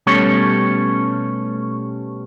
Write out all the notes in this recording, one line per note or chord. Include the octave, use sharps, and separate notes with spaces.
B2 G3 A3 C#4 C#5